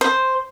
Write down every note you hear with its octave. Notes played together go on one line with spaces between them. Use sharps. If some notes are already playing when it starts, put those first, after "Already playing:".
C5